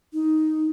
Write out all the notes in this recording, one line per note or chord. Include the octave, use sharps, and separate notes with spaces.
D#4